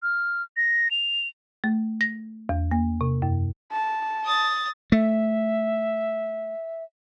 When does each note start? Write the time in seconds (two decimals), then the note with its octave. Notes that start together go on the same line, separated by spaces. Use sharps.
0.03 F6
0.57 A#6
0.91 F7
1.64 A3
2.01 A#6
2.49 E2
2.71 A#3
3.01 C3
3.22 F#2
3.72 A5
4.25 D#6 A6
4.92 A3 E5